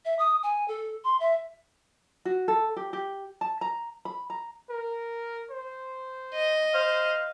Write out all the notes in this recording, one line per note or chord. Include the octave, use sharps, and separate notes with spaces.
E5
D#6
G#5
A4
C6
E5
F#4
A4
G4
G4
A5
A#5
B5
A#5
A#4
C5
D#5
C5 F5